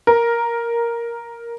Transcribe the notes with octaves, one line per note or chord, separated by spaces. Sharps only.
A#4